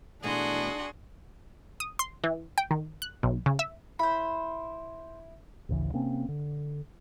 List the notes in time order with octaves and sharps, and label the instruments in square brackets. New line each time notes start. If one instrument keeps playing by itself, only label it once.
[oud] B2 E3 A3 [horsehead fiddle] D4 [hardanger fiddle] F#4 C6 [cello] G#4
[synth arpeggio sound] D#6
C6
E3
G5
D#3
F#6
B1
C#3
E5
[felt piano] E4 [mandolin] C5 B5
[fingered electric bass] A1 D2 C#3 E3
C3 A#3 C4 C#4
D3